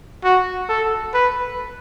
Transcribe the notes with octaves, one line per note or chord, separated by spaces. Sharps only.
F#4
A4
B4